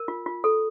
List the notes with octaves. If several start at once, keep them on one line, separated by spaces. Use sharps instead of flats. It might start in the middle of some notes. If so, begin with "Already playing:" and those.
Already playing: A#4
F4
F4
A4